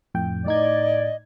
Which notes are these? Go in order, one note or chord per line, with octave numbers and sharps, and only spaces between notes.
F2 A2 G5
A2 D#4 D5 D#5 G#6